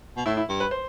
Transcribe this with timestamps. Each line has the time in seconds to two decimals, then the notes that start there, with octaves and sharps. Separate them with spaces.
0.17 B2
0.26 A2 E4
0.37 E4
0.49 G2
0.60 B4
0.71 C5